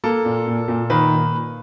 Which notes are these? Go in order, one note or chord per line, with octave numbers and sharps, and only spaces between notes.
A#3 A4
A#2
A#2
A#2
D#3 B4